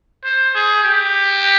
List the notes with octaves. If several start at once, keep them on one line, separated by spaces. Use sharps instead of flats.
C5
G#4
G4